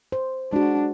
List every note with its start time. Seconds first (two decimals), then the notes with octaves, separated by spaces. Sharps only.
0.12 C5
0.53 G#3 D4 F#4